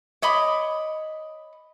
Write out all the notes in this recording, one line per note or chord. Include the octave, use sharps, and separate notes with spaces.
C#5 D#5 B5 D6